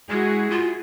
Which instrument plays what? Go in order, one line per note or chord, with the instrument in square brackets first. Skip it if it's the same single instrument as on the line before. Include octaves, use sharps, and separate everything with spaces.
[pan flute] G#3 [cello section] E4 F#4 G#4
[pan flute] F4